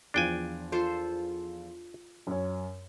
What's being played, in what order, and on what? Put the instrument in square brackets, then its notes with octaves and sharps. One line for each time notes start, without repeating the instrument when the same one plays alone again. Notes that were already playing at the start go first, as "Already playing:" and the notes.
[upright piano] E2 F3 [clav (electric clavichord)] D4 G5 G#5
[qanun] F4 A4 C5
[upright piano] F#2 C#5